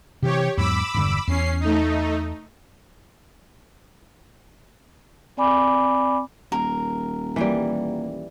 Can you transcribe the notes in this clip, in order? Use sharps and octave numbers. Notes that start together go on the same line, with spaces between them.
C3 E3 G4 C#5
E2 G#2 F#3 B5 D6 E6
E1 G2 D3
E2 C#4 C7
A3 D#4
C4 D5 G#5 B5 D6
D#1 A#4
E3 G3 A#3 F#5